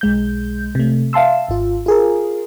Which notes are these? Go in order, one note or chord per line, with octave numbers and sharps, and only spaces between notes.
B1 G#3 G6
C3 A3
E5 F5 A5 C6 E6
G#1 F4
F4 G#4 A#4